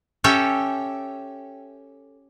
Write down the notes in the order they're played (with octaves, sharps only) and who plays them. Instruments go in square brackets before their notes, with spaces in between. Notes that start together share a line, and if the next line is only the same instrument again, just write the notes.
[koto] C#4 G4 A4 E5 G5